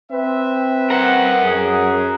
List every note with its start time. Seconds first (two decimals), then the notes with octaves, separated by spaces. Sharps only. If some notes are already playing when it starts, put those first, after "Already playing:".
0.12 C4 B4 E5
0.90 A#4 F#5
1.43 F#2 G#4